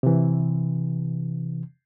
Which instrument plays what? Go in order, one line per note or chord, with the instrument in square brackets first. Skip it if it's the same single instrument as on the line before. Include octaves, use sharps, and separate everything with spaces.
[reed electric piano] C3 E3